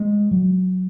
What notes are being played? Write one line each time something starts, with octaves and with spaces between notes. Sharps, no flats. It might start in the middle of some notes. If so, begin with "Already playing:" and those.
Already playing: G#3
F#3